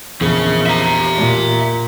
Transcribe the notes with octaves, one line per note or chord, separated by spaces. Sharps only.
A#1 E2 C#3 G#4
E5 A#5
A#2